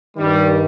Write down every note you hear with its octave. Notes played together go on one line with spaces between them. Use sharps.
G2 D#3 G3